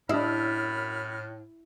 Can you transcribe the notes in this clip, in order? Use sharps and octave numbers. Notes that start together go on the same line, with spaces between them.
F#2 A2 D4 E4 G4 D#5 B5 F6